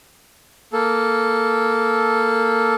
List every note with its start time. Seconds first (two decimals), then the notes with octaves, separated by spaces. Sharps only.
0.73 A#3 A4